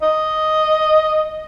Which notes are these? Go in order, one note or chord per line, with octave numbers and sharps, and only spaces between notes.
D#5